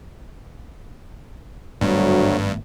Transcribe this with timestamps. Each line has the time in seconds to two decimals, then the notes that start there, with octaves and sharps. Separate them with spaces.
1.81 G#1 D2 G2 F#3 A3 B3